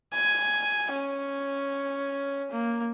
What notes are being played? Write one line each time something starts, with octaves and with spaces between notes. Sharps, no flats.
G#5
C#4
A#3